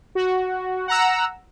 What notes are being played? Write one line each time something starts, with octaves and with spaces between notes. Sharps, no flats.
F#4
F#5 A#5 E6